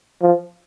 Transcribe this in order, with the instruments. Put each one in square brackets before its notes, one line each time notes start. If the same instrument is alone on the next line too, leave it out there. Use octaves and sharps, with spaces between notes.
[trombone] F3